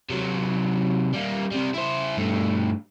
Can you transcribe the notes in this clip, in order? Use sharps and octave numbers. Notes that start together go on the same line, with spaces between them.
C3 F#3
G3 A#3
C3 G3
E4 C5
G2 A3